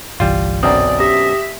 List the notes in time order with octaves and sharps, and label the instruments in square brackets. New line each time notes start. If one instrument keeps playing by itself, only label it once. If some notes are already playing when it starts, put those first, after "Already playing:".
[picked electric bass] G1 C2 E3 [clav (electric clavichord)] G3 F4
[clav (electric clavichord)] B1 F#2 C4 [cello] D5 [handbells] D#6
[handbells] G4 D#6 A#6 [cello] E5